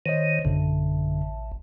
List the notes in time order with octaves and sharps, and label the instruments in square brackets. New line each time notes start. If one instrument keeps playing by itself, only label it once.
[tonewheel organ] D#3 [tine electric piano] C5 C#5 D#5
[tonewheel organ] A1 [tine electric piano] F#2 B2 D3